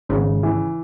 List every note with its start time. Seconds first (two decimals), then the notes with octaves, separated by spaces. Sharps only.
0.09 G#1 G#2 C#3
0.43 E3